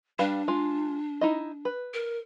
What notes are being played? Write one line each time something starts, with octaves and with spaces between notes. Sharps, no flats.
G3 D4 B4 F5
G#3 F4
D#4 E4 D#5
B4
A#4